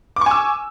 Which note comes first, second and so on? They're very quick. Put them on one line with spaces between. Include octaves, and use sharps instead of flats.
D6 C#6 G#5 E6